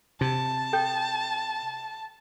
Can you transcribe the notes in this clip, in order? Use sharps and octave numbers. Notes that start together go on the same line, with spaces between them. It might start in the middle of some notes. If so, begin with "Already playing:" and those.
C3 A5
A4 G5 G6